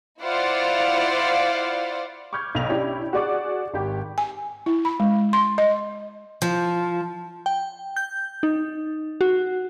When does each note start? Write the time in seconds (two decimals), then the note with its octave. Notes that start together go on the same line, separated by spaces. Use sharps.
0.21 E4 F4 C5 D5 F5 F#5
2.33 C#6 D6 F6 G6 G#6
2.55 B1 F7
2.69 C#4 D4 E4 G4 D5
3.13 F#4 G#4 D5 C#6 D6
3.74 G#1 G4
4.18 G#5
4.66 E4
4.85 B5
5.00 G#3
5.33 C6
5.58 D#5
6.42 F3
7.46 G5
7.96 G6
8.43 D#4
9.21 F#4